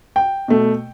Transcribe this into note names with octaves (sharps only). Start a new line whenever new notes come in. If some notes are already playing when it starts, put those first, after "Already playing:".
G5
B2 A3